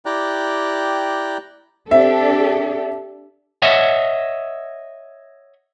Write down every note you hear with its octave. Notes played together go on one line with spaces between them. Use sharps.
E4 G4 D5 G5 A#5 F#6
C4 D4 G4 A4 E5
C#5 D#5 E5 F#5